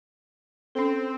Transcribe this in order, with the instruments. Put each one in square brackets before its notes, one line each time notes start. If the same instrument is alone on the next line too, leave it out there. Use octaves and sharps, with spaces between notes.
[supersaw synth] C4 [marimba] C#4 A4